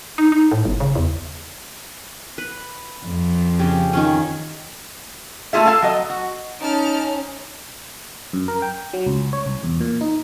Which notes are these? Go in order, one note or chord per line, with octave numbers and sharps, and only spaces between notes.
D#4
D#4
A2
G1
C#3
E2
B4
F2
C#3 G4
D#3 F3 C#4
A3 E4 F4 G#4 E5
A4 F5 G#5 A5
F#3 D#5
F#4
C#4 D#4 A5 F6 D7
F#2
A#4
G5
F#3
C#2
C#5
C2
E2
A#2
D#4